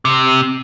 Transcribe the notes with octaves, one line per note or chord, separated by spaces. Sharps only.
C3